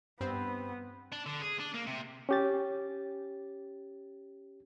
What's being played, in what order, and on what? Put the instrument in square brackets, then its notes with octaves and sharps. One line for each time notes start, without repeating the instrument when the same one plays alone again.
[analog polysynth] G2 C4 [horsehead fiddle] B3
[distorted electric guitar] D4
D3
G#4
D4
A#3
C3
[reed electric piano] C#4 G4 A6